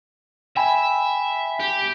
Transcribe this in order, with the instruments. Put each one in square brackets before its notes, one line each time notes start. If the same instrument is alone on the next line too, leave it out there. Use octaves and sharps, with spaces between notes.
[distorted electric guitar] E5 [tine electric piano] G5 G#5 B5
[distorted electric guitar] G4